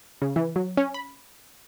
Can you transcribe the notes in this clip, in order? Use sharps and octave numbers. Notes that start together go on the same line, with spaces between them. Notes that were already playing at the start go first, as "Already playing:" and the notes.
C#3
E3
F#3
C#4
B5